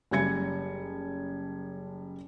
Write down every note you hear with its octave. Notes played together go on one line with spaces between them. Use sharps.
F#1 G3 G#5 G#6 C#7